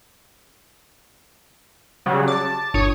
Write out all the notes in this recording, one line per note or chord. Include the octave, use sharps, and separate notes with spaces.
C#3 F#3 G3
A5 D6
G1 C#5 D#6